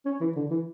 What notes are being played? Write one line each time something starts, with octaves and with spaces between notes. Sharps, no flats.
C#4
E3
D3
E3